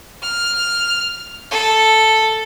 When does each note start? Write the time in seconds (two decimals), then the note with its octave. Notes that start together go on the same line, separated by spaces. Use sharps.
0.23 F6
1.51 A4